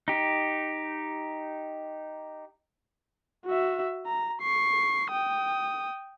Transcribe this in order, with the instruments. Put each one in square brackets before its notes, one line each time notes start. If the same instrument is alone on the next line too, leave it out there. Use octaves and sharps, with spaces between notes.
[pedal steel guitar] D#4 G4
[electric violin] F#4 E5
A#5
C#6 C7
G5 D#6